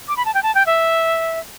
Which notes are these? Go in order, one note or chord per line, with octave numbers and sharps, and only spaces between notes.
D6
B5
A5
G5
A5
G5
E5